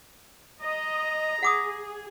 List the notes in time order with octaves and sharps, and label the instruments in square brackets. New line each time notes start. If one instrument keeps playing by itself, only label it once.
[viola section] D#5 [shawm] A#5
[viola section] G#4 [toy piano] F#5 D6 D#6